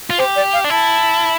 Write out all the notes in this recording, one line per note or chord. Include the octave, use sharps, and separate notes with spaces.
F4
G4 C5
D5
F5
D4
E4 A5